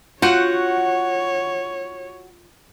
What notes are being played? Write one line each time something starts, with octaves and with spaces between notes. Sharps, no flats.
F4 F#4 C#5 F#5 G6